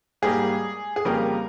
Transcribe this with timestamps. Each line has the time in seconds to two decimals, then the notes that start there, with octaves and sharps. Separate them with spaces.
0.22 G#2 G3 A#3 G#4
0.96 G#4
1.05 F2 C#3 G3 A#3 A#4